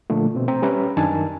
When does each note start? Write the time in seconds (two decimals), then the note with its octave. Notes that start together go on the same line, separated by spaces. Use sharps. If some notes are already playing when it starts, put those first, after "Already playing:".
0.10 A#2 D3 F3 A3
0.35 B2 C4
0.48 C4 G5 A#5
0.62 G3 C#4 G4 B4 E5 A#5
0.97 F#2 D#3 D4 A#4 G#5 A5